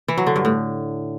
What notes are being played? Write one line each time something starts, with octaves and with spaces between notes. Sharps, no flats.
E3
F#3
D3
G2
A2